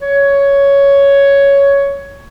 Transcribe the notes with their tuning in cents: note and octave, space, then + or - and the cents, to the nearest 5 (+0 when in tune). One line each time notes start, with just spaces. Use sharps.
C#5 +10